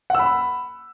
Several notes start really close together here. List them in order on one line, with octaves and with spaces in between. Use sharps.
F#5 E6 B5